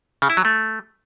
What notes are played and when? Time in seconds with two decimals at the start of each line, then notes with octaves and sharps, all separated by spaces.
0.22 C#3
0.30 E4
0.37 F#3
0.45 A3